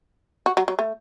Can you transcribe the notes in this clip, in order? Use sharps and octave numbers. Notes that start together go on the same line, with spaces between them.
F#4
F#3
F#3
A3